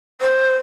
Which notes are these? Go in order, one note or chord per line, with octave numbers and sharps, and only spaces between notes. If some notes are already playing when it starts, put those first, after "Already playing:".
C5